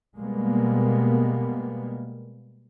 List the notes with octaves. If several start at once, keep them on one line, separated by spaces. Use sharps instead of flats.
B2 G3 G#3 A#3 B3